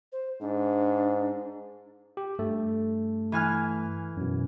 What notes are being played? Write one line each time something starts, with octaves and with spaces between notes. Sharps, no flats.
C5
G#2 D4
G4
G2 A3 A4
E3 G#5 F6
F#2 B2